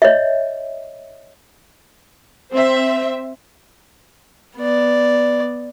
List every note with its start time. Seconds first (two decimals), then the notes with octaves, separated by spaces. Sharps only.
0.02 C#5 D#5 E5
2.51 C4 C5 E5
4.57 B3 D5